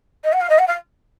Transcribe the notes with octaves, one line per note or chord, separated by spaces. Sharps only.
D#5
F#5
F5
D#5
F#5
F5